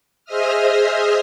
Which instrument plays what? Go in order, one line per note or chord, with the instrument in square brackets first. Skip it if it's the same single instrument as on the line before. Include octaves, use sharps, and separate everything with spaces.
[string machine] G#4 C5 D#5 E5 D#6 F6